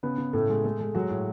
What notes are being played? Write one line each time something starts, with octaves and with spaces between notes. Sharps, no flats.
C#3 B3 B4
C#3
A2 A3 A4
G#3
G#3 A3 A4
G#3
F#3 G#3 F#4
A2